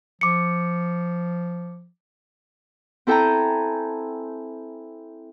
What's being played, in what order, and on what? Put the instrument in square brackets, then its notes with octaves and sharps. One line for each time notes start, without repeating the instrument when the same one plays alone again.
[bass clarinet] F3 [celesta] D6 C#7
[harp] C4 E4 A4 G5 G#5 A#5